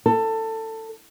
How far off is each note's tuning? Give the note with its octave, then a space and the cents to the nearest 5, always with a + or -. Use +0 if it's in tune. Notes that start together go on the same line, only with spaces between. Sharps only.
A4 +20